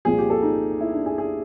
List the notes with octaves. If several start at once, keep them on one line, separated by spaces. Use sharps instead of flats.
C2 A#2 F3 G#4
G4
A4
D#4
E4
D4
G#4
G#4